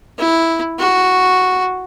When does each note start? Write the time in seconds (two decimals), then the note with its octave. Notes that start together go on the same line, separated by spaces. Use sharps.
0.19 E4
0.79 F#4